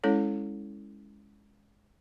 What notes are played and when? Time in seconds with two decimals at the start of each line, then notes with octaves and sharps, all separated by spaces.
0.04 G#3 C#4 E4 A4 C#5